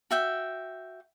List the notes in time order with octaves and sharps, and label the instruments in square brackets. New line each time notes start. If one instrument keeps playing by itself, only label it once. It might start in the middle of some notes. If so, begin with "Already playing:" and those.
[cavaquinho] F#4 E5 G5